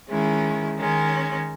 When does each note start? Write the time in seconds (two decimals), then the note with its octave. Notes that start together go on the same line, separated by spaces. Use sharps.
0.09 D#3 G#3 C#4 E4
0.79 D#3 G#3 C#4